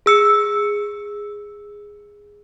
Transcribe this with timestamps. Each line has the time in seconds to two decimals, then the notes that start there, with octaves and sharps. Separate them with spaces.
0.06 G#4 E6 C#7